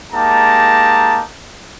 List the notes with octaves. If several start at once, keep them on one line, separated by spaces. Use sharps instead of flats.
G#3 A#3 D#4 G4 A5 A#5